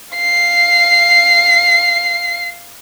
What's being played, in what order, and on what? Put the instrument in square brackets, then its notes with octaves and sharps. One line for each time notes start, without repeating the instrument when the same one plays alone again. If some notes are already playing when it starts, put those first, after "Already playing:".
[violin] F5 C7